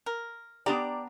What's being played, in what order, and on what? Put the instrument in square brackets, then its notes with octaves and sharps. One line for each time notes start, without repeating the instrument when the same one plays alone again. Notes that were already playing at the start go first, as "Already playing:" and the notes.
[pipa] A#4
[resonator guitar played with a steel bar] B3 D4 A#5 [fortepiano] G4 [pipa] D5